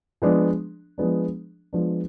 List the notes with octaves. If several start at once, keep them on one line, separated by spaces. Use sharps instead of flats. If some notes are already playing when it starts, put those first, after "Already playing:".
F3 G#3 B3 D4
F3 G#3 B3 D4
F3 G#3 B3 D4